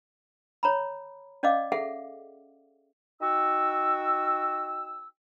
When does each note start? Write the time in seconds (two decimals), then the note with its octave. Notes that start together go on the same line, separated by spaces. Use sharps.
0.63 C#5 A#5 B5
1.43 C#4 D5 D#5 F5 D6
1.72 G#4 A4 E5 F#5
3.21 D#4 F#4 G5 E6